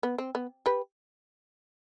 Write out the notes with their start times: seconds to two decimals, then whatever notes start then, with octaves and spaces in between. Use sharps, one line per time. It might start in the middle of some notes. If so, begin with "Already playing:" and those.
0.03 B3
0.18 C4
0.35 B3
0.66 G4 B4